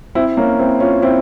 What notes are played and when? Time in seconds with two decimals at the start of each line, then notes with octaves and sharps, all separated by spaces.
0.15 C4 E4
0.37 A#3 C#4
0.59 C4 E4
0.80 C#4 F4
1.02 C4 E4